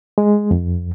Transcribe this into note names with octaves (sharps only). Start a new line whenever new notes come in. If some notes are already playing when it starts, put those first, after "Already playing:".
G#3
F2